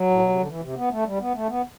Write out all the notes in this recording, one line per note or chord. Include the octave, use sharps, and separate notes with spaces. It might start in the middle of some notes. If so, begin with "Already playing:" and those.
Already playing: F#3
A2
B2
C3
D3
E3
C3
B3
A3
G3
B3
A3
B3